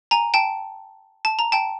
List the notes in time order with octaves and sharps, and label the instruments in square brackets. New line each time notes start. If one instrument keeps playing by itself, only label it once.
[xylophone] G#5 A#5
G5 A5
A5
A#5
G5 A5